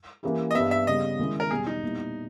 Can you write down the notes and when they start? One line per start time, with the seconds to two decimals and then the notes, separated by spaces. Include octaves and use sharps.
0.23 E3 A#3 C#4 E4 G4
0.51 D#5
0.55 G2 G3 B3 E5
0.71 E5
0.87 C#3 G3 B3 D#5
1.19 D#3 G#3 C#4 E4
1.40 A#4
1.51 E2 B2 G3 G#4
1.67 D#4
1.83 A#2 G3 B3 E4